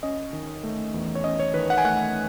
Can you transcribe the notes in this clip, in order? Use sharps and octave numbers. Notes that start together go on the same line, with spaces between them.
C#4 D#5
D#3
A3
E2
C#5
C#4 D#5
C#5
D#3 B4
F#5
G#5
A3 F#5